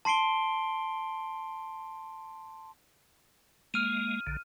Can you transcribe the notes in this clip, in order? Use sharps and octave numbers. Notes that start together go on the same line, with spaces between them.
A5 C6 C7 D7 G7
G#3 A#3 F6 D#7
A#1 D3